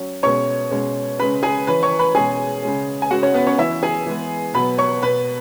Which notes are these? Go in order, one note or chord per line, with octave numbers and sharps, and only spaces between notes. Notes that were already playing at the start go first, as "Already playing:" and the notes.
Already playing: F#3 C#4
B2 G#3 C#4 C#5 C#6
B2 G#3 C#4
C#3 G#3 C#4 B4 B5
G#4 G#5
E3 C#4 B4 B5
C#5 C#6
B4 B5
B2 G#3 C#4 G#4 G#5
C#3 G#3 C#4
G#5
C#3 G#3 C#4 F#4 F#5
C#4 C#5
B3 B4
C#4 C#5
E3 C#4 E4 E5
G#4 G#5
E3 G#3 B3
B2 F#3 B3 B4 B5
C#5 C#6
B2 B3 B4 B5